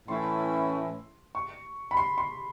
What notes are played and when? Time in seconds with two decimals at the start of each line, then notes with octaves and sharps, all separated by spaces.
0.08 A2 E3 A3 C#4 E4 C6
1.35 C#6
1.91 B5
1.97 C6
2.18 C6